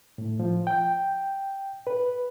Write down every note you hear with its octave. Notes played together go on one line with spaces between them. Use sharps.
A2
F3
G5
B4